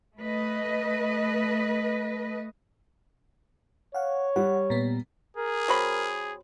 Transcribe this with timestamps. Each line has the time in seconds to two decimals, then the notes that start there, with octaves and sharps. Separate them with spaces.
0.19 A3 B4 D#5
3.94 C#5 F5 F#5
4.36 G3 F#5
4.70 A#2 B3
5.37 G#4 A#4
5.68 F#3 C4 B5